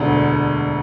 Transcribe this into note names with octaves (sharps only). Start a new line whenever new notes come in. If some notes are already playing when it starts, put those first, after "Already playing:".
Already playing: E1 D2 D3